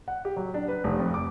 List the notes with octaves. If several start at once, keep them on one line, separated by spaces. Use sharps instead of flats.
F#5
G4
F#3
D4
B4
F1
F2
D6